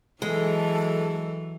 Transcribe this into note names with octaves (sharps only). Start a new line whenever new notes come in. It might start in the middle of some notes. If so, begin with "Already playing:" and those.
E3 F#3 G#3 A4